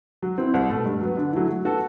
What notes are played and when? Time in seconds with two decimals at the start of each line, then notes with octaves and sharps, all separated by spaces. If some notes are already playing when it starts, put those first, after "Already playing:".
0.22 F#3
0.38 C4 E4
0.54 C2
0.70 B2 A3
0.85 G2
1.01 F#3 B3
1.17 D3
1.33 F#3 A3 E4
1.49 F#3
1.65 B3 F#4 A4